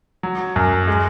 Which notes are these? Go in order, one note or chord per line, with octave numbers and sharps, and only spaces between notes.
F#3
F#2
G#3